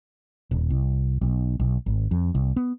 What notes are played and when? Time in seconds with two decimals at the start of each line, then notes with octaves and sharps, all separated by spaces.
0.51 D#1
0.70 C2
1.21 B1
1.60 B1
1.86 G#1
2.11 F2
2.35 C2
2.56 B3